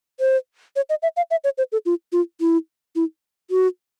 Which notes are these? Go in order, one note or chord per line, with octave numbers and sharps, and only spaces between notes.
C5
C#5
D#5
E5
F5
E5
C#5
C5
A4
F4
F4
E4
E4
F#4